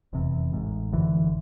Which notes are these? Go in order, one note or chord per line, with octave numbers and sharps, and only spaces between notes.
F1 E2 C3
A1 G#2
G#1 F#2 D3 E3